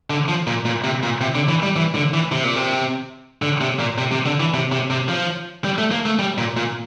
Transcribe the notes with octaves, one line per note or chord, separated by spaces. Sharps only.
D3
F3
A#2
A#2
C3
A#2
C3
D3
E3
G3
E3
D3
E3
C3
A#2
C3
D3
C3
A#2
C3
C3
D3
E3
C3
C3
C3
F3
G3
A3
A#3
A3
G3
A#2
A#2